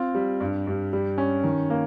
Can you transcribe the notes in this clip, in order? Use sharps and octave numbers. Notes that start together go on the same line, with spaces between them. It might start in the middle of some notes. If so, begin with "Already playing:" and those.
Already playing: C4 F4
G3
G2
G2
G3
C#4
D#3
A#3